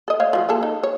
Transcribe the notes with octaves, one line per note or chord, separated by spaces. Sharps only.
A4 D#5
A3 C#5 F5
F3 F#3
A#3 G#4 A4
D#4
C#5